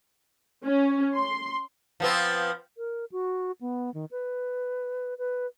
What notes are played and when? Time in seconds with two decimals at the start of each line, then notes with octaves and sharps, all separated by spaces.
0.64 C#4
1.15 C6
2.00 F3 B3 C4
2.78 A#4
3.12 F#4
3.61 B3
3.94 D#3
4.11 B4
5.18 B4